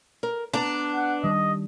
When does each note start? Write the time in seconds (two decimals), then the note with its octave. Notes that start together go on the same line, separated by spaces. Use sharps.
0.23 A#4
0.53 B3 D4 A5 A#5
0.94 F#5
1.24 D#3 G3 D#5